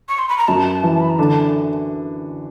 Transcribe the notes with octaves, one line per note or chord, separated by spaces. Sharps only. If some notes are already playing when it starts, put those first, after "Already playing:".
C#6
C6
B5
A#5
F#2 A5
E3
B5
A#5
D3 A5